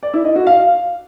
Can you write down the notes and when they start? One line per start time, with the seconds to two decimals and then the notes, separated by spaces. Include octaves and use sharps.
0.03 D5
0.14 E4
0.25 D#5
0.36 F#4
0.47 F5